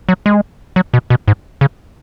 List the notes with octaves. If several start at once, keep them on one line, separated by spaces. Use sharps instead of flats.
F#3
G#3
F#3
B2
B2
G#2
C#3